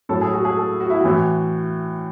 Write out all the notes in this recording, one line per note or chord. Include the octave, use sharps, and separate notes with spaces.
A2 F#3 A4
G#4
F#4
G#4
A4
F#4
E4
A2 E3 F#4